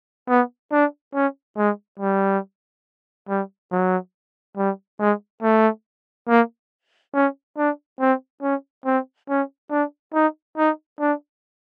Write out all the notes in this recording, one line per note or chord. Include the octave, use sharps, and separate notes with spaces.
B3
D4
C#4
G#3
G3
G3
F#3
G3
G#3
A3
A#3
C#4
D4
C4
C#4
C4
C#4
D4
D#4
D#4
D4